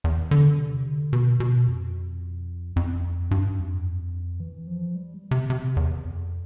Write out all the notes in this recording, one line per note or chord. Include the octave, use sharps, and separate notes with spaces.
E2
D3
C3
D3
B2
B2
F2
F2
G2
F2
E3
F3
G3
C3
C3
E2
F2